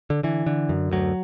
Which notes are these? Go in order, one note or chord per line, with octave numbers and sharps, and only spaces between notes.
D3
D3 E3
D3
F#2
D2 F#3